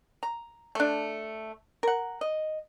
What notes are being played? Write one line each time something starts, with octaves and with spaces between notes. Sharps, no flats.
A#5
A3 D4
A#4 F#5
D#5